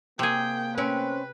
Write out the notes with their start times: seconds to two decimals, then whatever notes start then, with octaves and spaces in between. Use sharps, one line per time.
0.19 C3 A#3 G#4 G5
0.78 C4 C#4 B4